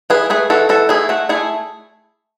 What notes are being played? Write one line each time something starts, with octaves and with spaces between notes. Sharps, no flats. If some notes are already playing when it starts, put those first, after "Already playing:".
E3 G#4 B4
A3 G#4 B4
E3 F#4 A4
E3 F#4 A4
A3 E4 G#4
A3 F#4
A3 E4 G#4